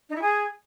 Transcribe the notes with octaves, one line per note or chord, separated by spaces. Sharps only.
D#4
E4
G#4